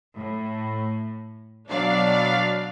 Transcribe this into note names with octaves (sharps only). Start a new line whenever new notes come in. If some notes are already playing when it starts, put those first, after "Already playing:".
A2
B2 F#3 D4 D5 F5